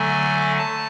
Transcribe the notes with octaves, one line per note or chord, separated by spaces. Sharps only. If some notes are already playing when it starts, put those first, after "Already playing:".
Already playing: D3 F#3 A3 G#5
A5